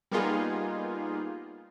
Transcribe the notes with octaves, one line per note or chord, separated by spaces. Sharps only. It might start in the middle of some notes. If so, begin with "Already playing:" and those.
G3 A#3 B3 D#4 F4 G#4